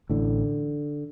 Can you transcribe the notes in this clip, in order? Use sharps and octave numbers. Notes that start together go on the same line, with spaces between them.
A1 A2 D3